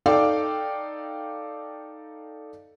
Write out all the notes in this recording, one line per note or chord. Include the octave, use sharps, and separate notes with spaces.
D#4 A4 D5 F5 G5 D6